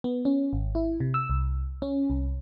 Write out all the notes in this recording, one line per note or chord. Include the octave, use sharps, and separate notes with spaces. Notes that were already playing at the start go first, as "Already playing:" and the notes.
B3
C#4
G#1
E4
C3
E6
C2
C#4
C2